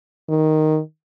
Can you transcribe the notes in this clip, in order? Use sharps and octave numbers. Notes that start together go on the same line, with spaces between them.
D#3